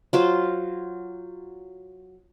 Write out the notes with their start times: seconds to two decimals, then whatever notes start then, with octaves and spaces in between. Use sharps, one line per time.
0.13 F#3 F4 C5